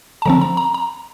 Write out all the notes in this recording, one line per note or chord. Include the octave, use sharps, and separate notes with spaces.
A5
D3 F3 C4 A#5
A#5
A#5
A#5